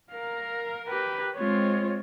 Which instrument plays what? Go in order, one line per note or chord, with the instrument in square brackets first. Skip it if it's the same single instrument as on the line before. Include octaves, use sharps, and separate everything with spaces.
[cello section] A#4 [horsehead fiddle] F5
[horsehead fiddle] G4 B4
[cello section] G#3 C4 [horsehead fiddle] F4 C#5